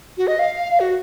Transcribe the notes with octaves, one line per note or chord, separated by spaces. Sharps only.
F#4
D#5
F5
F#4